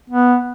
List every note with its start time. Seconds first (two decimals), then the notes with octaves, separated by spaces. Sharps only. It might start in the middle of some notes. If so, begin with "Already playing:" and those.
0.10 B3